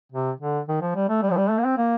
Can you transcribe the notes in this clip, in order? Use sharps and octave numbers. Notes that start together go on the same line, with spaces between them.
C3
D3
D#3
F3
G3
A3
G3
F3
G3
A3
A#3
C4
A#3